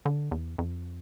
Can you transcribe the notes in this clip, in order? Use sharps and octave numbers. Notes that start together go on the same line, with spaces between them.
D3
E2
F2